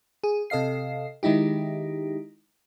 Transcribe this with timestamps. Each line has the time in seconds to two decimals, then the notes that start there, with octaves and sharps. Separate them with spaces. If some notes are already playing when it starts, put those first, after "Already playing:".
0.24 G#4
0.50 C3 A4 D#5 F5 C7
1.23 D#3 G#3 D#4 E4 G4